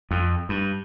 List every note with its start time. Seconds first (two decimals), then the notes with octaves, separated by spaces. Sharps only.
0.11 F2
0.49 G2